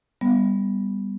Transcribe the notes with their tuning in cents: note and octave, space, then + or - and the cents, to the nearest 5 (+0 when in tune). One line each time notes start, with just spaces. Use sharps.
G3 +10 B3 +0